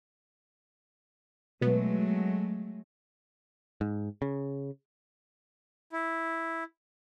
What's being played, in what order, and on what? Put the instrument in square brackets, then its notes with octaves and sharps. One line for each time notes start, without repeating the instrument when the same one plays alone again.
[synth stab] B2 B3 [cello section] F#3 G#3 A3
[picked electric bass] G#2
C#3
[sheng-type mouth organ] E4